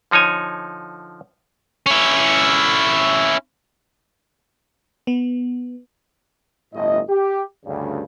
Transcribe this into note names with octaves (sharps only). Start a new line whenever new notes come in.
D3 F3 D#4 C#5 G#5
C#4 E4
B3
G1 A2 A3 D#5
G4
D2 G2 C#3